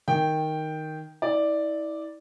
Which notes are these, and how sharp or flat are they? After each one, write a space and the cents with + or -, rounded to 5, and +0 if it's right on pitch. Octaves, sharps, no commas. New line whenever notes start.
D#3 +0 G5 +0
E4 -35 D5 +0